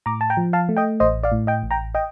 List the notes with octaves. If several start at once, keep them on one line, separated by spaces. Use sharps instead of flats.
A2 A#5 D6
A5
G5 A#5
F3
F5 A5
A3
D#5 G5
A1 C5 D#5
D5 F5
A2
D#5 G5
A1
G5 A#5
D#5 G5